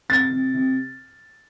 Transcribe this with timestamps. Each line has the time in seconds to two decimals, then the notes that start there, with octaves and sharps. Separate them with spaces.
0.09 C3 A6
0.31 C3
0.54 C3